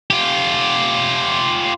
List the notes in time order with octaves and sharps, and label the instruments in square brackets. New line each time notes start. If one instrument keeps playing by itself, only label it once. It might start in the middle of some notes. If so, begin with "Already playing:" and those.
[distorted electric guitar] F4 G4